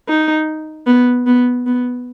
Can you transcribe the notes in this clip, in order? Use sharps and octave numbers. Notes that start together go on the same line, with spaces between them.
D#4
B3
B3
B3